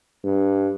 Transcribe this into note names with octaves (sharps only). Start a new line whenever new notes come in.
G2